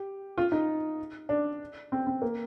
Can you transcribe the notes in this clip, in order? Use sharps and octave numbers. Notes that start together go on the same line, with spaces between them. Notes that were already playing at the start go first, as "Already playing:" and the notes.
Already playing: G4
F4
D#4
D4
C4
C4
A#3